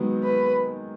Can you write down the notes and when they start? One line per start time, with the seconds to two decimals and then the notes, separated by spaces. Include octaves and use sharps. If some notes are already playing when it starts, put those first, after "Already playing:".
Already playing: D#3 F#3 G#3 B3
0.24 B4